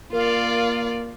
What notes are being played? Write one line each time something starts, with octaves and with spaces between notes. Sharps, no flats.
A#3 F4 A#4 D5 F5